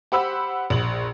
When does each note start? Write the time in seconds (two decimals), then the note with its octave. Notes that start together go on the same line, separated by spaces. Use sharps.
0.12 G4 C5 F#5 B5 E6
0.70 A#1 F#7